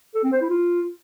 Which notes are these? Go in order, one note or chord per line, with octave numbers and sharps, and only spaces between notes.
A4
C4
C5
E4
F4